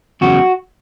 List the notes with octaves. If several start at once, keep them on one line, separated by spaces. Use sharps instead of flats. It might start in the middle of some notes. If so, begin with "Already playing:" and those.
E2 C#3 F#3 F#4